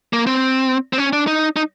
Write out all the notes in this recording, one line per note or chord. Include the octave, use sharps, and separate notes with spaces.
A#3
C4
C4
C#4
D4
D#4
D#4